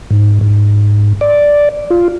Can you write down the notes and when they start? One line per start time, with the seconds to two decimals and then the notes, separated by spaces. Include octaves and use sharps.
0.11 G#2
0.41 G#2
1.21 D5
1.90 F4